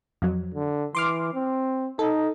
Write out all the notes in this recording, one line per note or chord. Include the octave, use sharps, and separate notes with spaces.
F2 F#3
D3
E3 C6 D6 F6
C4
D#4 A4